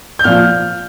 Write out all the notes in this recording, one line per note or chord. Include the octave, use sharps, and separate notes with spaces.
G6
A#2 F3 F6